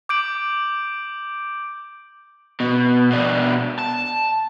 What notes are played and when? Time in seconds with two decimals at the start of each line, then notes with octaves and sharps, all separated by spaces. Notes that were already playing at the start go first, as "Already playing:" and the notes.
0.09 D6 G6 D7 F#7
2.60 B2
3.11 B2 D4
3.79 A5